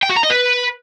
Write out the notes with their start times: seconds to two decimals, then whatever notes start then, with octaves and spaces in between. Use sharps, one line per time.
0.03 G5
0.09 F#4
0.16 A#5
0.23 D#5
0.30 B4